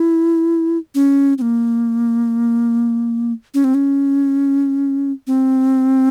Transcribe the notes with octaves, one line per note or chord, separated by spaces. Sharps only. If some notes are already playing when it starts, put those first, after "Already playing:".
Already playing: E4
C#4
C4
A#3
C#4
C4
C#4
C4